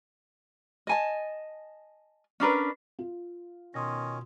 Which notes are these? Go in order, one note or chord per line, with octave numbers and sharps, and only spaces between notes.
D#5 G#5 A5
C#4 D4 A#4 B4
F4
B2 D#3 C#4 C6 D#6 A#6